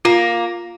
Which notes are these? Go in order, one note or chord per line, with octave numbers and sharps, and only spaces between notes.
A#3 F4